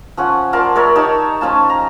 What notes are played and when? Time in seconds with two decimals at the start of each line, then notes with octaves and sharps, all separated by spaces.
0.17 F3 C#4 F#5
0.53 F4 A#4 D5 A5
0.75 A#4 C#5 D5 E5
0.95 D#4 G4 C#5 A5
1.41 F3 C#4 F4 A5
1.70 A#5